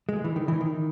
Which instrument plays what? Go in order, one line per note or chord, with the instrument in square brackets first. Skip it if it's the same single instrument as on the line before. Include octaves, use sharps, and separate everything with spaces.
[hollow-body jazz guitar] G#3
E3
D#3
E3
D#3